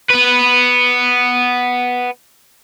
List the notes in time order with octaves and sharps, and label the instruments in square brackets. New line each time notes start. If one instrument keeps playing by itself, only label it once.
[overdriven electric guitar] B3 B4